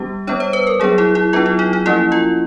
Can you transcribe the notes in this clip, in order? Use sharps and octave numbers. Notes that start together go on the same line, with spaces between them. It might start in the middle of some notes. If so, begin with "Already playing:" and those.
Already playing: G3 B3 D4 G4
G3 B3 D4 C#5
C5
B4
A#4
F#3 B3 D4 G#4
E4
E4
F#3 B3 D4 F4
E4
D#4
D#4
F3 A#3 C#4 E4
F4